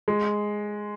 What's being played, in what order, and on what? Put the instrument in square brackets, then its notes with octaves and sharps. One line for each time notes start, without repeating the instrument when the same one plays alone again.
[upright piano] G#3